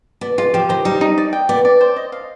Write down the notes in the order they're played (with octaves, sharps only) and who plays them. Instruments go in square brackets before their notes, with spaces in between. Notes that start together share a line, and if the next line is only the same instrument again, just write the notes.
[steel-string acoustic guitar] B3 [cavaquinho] D5
[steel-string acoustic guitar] G#3 [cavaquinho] F4
[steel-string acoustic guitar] F3 [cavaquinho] G4
[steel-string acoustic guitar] D#3 [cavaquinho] C5
[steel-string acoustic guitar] G3 [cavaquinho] D#4
[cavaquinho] D#4
D5
G5
[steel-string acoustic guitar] B3 [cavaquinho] D5
[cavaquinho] D5
C5
D#5
F5